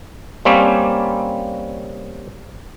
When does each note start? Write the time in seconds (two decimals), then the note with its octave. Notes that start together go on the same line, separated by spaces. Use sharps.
0.45 G3 A#3 C4 C#4